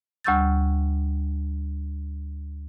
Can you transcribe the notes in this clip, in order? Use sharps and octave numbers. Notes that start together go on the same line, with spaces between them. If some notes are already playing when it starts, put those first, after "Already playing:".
D2 G3 C#6 E6 G6 A6